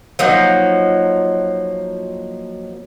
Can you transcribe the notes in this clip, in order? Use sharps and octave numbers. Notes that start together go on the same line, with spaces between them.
F3 F#3 A#3 D#4